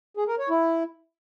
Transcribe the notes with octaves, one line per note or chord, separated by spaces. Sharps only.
G#4
A#4
C#5
E4